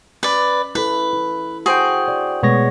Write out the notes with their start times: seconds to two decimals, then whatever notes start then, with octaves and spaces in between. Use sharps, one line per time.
0.23 C#4 B4 D5
0.75 E4 A4 B4
1.13 E4
1.66 F#4 G#4 C5 G5
2.08 D5
2.43 B2 G#3 A3 B3 C#5 A#6